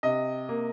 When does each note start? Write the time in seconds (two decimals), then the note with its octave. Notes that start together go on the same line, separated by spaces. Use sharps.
0.03 C3 D#5
0.49 A#3